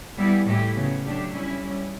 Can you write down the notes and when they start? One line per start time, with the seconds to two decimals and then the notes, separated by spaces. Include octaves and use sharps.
0.17 E3 G3 B3 E4 G4
0.46 A2 E3 A3 E4 G4
0.76 C#3 F#3 B3
1.04 F#3 A3 D4 G4
1.33 G3 C#4 E4
1.62 G3 C#4 E4